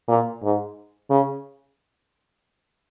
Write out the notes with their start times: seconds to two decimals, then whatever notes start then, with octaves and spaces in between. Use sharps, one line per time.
0.08 A#2
0.43 G#2
1.10 C#3